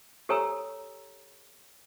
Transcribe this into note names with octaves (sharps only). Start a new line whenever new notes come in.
G4 A4 C#5 G#5 A#5 E6